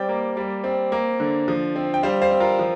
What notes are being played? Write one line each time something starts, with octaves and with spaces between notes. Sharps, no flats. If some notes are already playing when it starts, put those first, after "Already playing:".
Already playing: G3 C4 D5 G5
A#3
G3
C4
A#3
D3
F3
C4
G5
G3 C5 F5
C5 F5
C4
F4 A#4
F3